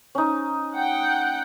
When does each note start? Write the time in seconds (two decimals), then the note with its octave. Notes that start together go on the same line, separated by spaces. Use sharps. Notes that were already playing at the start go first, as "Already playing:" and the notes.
0.15 C#4 D#4
0.74 F#5 G5